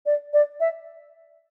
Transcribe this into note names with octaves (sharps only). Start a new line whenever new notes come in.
D5
D5
E5